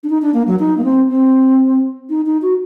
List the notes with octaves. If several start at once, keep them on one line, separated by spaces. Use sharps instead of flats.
D4
D#4
D4
A#3
F#3
D#4
A#3
C4
C4
D#4
D#4
F#4